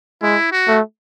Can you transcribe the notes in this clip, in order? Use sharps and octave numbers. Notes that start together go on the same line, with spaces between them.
G#3 E4
F#4
A3